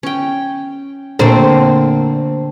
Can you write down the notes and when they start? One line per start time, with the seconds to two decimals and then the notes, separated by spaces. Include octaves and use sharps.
0.03 C#4 G5
1.19 A#2 D3 A3 C4 C5